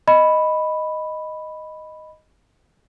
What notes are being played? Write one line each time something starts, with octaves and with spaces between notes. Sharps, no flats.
D#5 B5